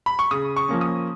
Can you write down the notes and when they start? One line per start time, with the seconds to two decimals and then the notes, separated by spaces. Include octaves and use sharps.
0.06 B5
0.19 C#6
0.31 C#3 D#6
0.56 C#6
0.69 F3 A#3 C#4
0.81 D#6